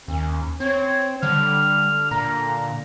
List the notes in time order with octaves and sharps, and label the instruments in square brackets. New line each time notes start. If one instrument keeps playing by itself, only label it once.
[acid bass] D#2 [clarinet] C#4
[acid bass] C4 [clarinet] C#5
[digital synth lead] D3 [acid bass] G3 [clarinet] F6
[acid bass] A#2 [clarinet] A#5